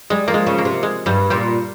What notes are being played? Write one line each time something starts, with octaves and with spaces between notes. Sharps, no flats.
G3 G#3
F3 A#3
G#3
C#3
A#3
C3
G#3
G2 G3
A#2 G3